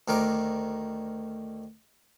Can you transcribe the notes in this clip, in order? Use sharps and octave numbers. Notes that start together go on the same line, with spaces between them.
D2 D#3 A#4 D6